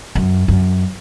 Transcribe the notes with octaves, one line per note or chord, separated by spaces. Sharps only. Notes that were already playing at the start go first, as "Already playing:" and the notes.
F#2
F#2